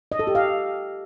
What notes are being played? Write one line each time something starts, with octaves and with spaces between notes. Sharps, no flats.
D#5
A4
G4
F5